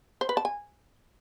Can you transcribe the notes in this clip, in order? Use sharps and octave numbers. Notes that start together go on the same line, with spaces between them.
C5
B4
A5
G#5